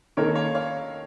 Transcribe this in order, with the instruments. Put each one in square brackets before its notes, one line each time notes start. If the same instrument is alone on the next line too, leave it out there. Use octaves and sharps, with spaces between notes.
[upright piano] D#3 A#3 C#4 A4 [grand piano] A#4 C#5
[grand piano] C#5 F5
C#5 F5